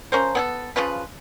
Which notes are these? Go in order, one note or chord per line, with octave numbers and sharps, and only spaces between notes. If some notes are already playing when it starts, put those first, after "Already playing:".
F3 C#4 A#4 C5
B3 G#4 A4
C#3 F3 F4 B4